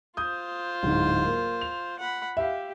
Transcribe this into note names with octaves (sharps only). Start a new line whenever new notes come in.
F4 C5 D#6 G6
D1 G#2
A#3
F7
F#5 B5
G4 E5 F5